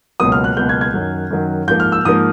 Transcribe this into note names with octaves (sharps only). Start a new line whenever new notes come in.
C#2 B2 F#3 A#3 D#6
F6
F#6
C#2 B2 F#3 A#3 G6
G#6
G#6
F#2 D#3 F#3
F#2 D#3 F#3
G#2 F3 A#3 G6
F6
E6
G#2 F3 A#3 D#6